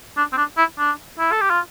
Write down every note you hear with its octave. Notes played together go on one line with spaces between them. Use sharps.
D4
C4
D4
E4
D4
E4
A4
G4
F4